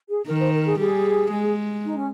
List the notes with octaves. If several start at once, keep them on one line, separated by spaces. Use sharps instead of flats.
G#4
D#3 A#4
C5
A#4
G#4
G3 G#4
G#3
D#4
C#4